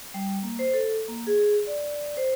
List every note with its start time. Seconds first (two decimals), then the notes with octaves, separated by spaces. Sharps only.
0.14 G3
0.43 A#3
0.59 C5
0.74 A4
1.08 A#3
1.27 G#4
1.67 D5
2.17 C5